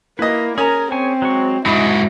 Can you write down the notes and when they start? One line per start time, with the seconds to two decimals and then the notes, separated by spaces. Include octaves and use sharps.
0.19 A#3 E4 B4 D#5
0.58 C#4 G#4 A#4 A#5
0.92 C4 G#4 C#5 G#5
1.22 F#3 G#3 C#6
1.66 G#2 F#3 E4 D#5 B5